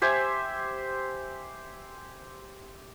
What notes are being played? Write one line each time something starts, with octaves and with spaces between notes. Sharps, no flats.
G4 C5 E5 G#5